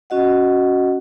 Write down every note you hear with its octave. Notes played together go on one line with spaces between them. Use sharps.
C#4 F#4 D#5 F#5